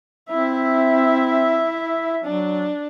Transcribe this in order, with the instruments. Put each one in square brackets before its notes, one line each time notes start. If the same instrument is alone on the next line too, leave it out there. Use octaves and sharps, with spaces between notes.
[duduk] C4 [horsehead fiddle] E4 E5
[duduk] F#3 [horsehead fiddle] D4